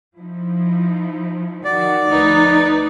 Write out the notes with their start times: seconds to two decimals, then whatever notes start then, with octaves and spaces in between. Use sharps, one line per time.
0.18 F3 D#4 E4
1.65 D#3 F#4 D5
2.08 D2 F3 D#4 B4